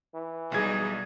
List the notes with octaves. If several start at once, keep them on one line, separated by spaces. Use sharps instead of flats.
E3
B1 G3 D#4 G#4 G#6